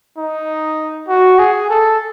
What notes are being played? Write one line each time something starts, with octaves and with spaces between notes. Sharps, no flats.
D#4
F#4
G#4
A4